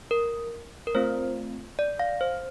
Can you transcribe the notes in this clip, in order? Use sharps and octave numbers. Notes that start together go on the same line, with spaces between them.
A#4
A#4
A3 C4 F4 C5
D5
F5
C5